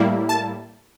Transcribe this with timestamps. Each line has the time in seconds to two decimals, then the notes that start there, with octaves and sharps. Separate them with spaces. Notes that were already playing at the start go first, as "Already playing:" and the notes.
Already playing: A2 G3 A#3 E4
0.29 A5